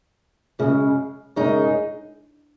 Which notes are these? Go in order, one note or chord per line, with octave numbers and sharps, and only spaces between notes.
F#2 C#3 G#3
F#2 C#3 G#3 D#4